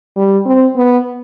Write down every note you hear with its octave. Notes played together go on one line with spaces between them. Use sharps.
G3
C4
B3